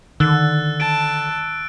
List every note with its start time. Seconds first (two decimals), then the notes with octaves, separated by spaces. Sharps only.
0.20 D3 D#3 E6 F#6 A6
0.80 A5 D7